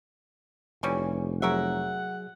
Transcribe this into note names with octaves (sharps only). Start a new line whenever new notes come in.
F1 E3 G3 C#4
F#3 G#4 A#4 C#5 E5 F#5